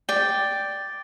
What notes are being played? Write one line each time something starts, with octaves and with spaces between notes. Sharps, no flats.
D5 G5